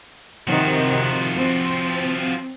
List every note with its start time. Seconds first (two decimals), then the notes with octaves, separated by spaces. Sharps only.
0.47 C3 D#3 F3 F#4
1.35 C4